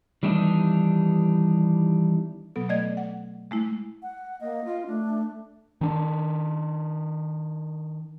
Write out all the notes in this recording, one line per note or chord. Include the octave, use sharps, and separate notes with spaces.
D#3 E3 G3 B3 D4 D#4
B2 F#3 B3 A4
A3 D5 D#5 G#6
F#5
G#3 A3 E4
F#5
A#3 D#5
F4
A3 D4
D#3 D4